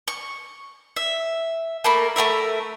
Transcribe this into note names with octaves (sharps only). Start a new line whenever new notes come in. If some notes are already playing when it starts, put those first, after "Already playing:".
C#6
E5
A3 A#3 A#4 B5
A3 C4 A#4 E5